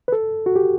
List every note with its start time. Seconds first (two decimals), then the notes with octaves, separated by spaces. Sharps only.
0.08 B4
0.12 A4
0.46 F#4
0.56 G4